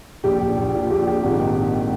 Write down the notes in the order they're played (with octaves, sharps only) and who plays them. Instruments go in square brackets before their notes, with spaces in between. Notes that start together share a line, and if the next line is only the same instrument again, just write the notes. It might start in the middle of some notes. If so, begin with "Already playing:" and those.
[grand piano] A#1 G4
A#1
A#1
A#2 F4
A#1 G4
A#1 G4
G#1
D#3
G#2